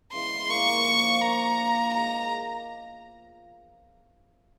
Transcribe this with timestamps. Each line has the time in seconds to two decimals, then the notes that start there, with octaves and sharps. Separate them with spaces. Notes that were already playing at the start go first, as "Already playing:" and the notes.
0.13 C#3 E3 G#3 B3 C6
0.49 A#2 F3 A#3 C#6
0.85 A#2 F3 A#3
1.21 A#3 D4 F4 A#5
1.57 A#3 D4 F4
1.94 G#2 D#3 G#3 A#5